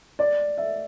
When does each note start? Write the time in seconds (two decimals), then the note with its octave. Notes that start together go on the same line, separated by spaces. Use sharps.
0.19 D5
0.58 E5